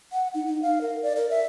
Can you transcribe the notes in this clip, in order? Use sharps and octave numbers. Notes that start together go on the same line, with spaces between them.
F#5
D#4
D#4
F5
A#4
D5
A#4
E5